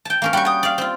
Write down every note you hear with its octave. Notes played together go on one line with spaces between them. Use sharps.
G5 A5
A#3 C#4 A#4
G3 F#4 G5 C#6
G5 D#6
D5 F5
C4 F4